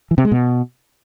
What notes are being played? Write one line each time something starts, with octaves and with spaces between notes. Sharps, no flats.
E3
C3
G#3
B2